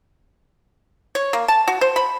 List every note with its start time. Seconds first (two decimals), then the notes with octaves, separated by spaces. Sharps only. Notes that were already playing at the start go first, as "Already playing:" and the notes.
1.15 C#5
1.33 A#3
1.48 A5
1.68 F#4
1.81 C5
1.96 B5